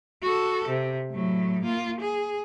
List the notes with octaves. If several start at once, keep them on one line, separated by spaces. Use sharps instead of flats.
F#4 A4
C3
A2 F#3
A#3 F4
G#4